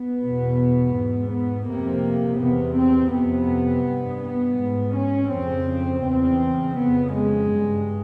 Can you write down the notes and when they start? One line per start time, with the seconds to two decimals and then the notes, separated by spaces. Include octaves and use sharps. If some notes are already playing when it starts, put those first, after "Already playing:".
Already playing: B3
0.21 E2 B2
0.93 G#2
1.30 B3
1.66 F2 C3 A#3
2.40 E2 C3 B3
2.76 C4
3.13 F2 C3 B3
3.86 G2
4.22 B3
4.59 G#2
4.96 C#4
5.32 F2 C#3 C4
6.05 E2 C#3 C4
6.78 F2 C#3 B3
7.15 G#3
7.52 G2